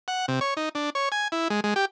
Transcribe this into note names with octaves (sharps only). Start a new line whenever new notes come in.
F#5
C3
C#5
D#4
D4
C#5
G#5
E4
G#3
G#3
G4